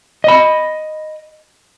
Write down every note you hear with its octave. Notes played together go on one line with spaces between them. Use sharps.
D#5 B5